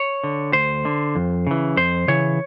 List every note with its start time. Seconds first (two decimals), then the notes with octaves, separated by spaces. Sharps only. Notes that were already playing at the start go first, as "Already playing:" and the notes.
Already playing: C#5
0.24 D3
0.53 D2 C5
0.85 D3
1.16 F2
1.47 C#3 E3
1.77 F2 C5
2.08 C#3 E3 C#5